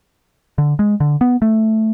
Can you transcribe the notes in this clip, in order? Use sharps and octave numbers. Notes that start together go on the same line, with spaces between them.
D3
G#3
D3
B3
A3